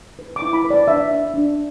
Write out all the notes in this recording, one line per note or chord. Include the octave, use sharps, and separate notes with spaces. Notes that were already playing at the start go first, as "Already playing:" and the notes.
B4
D6
E4
B5
B4
D5
D4 E5
D4
D4